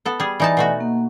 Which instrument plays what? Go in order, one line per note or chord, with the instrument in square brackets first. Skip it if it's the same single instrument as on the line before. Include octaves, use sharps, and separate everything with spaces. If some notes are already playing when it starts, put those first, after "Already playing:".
[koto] B3 A4
G3 G#4
[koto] E3 D#4 A5 [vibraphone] D5 G#5
[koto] B2 A3 F#4
[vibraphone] A#3